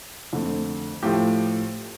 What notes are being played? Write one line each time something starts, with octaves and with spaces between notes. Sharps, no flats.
F2 D3 A3
A2 F3 A3 G4